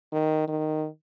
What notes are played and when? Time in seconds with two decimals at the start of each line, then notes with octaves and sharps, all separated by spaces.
0.12 D#3
0.48 D#3